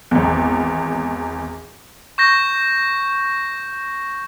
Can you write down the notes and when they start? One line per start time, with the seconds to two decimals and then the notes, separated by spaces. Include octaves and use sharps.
0.11 G#1 E2
2.18 C#6 G6 A#6